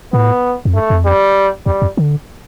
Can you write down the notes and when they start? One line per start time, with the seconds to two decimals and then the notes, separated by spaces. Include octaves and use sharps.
0.13 A2 B3
0.65 F2
0.74 G2 A3
0.90 F2
1.05 G3
1.66 E2 G3
1.82 F2
1.97 D3